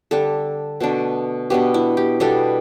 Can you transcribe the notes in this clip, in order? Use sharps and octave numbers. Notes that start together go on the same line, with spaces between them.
D3 G3 D4 A4
B2 A3 D4
B2 B3 D4 G4
E4
G4
B2 G3 B3 D4 A4